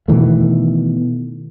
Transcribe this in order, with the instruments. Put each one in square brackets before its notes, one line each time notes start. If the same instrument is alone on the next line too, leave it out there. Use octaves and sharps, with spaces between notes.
[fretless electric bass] B2 D#3 E3 A3